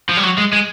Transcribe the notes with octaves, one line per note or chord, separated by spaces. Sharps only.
F3
G3
F#3
G#3
G#3